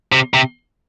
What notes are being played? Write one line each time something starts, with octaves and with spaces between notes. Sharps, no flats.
C3
C3